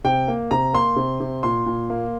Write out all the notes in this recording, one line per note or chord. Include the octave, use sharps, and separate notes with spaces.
C3 G5
A#3
C3 A#5
A#3 C6
C3
C3
A#2 C6
A#2
A#3